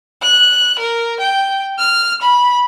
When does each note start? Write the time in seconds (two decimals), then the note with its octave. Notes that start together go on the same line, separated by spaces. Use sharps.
0.22 F#6
0.79 A#4
1.20 G5
1.79 F6
2.22 B5